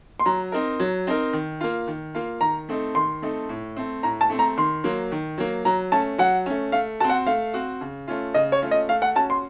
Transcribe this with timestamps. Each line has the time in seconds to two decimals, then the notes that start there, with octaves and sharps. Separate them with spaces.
0.20 C6
0.26 F#3 A#5
0.52 C4 D#4 A#4
0.80 F#3
1.07 C4 D#4 A#4
1.33 D#3
1.61 A#3 F4
1.87 D#3
2.15 A#3 F4
2.41 D#3 A#5
2.69 A3 C4 D#4 A4
2.95 D#3 C6
3.22 A3 C4 D#4 A4
3.49 A2
3.76 A3 C4
4.03 A2 A#5
4.21 A5
4.30 A3 C4
4.39 A#5
4.57 D#3 C6
4.84 F#3 A#3
5.12 D#3
5.38 F#3 A#3
5.65 F#3 A#5
5.92 A3 C#4 A5
6.18 F#3 F#5
6.46 A3 C#4
6.72 A3 F5
7.00 C4 F#4 A5
7.10 F#5
7.27 A3 F5
7.54 C4 F#4
7.81 C#3
8.08 A3 C#4 F4
8.34 C#3 D#5
8.52 C#5
8.62 A3 C#4 F4
8.71 D#5
8.89 A3 F5
9.02 F#5
9.15 C#4 F#4 A5
9.30 C6